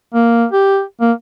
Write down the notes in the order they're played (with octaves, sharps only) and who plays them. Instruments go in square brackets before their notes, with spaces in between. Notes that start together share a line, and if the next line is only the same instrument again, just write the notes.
[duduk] A#3
G4
A#3